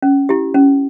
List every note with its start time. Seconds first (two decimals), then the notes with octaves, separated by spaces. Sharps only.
0.02 C#4
0.29 E4 G4
0.54 C#4